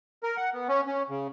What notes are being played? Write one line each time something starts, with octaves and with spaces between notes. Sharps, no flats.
A#4
F#5
B3
C#4
C#4
C#3